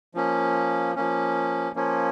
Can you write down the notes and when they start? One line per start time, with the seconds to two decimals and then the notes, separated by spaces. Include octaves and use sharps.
0.15 F3 A#3 C#4
0.96 F3 A#3 C#4
1.76 F3 A#3 C#4